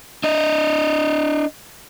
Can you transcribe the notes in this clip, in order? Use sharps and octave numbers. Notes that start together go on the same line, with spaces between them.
D4 D#5